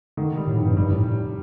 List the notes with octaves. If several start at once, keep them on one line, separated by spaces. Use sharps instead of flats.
D3 D#3
G3
A2
F1 G2
G2 G3
A2